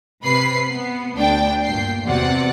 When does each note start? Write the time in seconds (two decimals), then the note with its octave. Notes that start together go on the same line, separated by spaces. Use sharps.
0.23 C3 B4 B5 C7
0.68 B3
1.16 D2 D4 G5
1.63 G1 A#2 G5 C7
2.05 E2 C3 F#4 D5 F#5